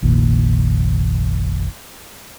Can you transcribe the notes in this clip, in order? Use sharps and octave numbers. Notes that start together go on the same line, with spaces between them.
F1 A#1 A#2 D#3